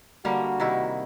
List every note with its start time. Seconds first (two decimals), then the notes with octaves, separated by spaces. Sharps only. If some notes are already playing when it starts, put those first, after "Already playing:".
0.25 D3 G3 A#3 F#4
0.60 C3 D#3 E4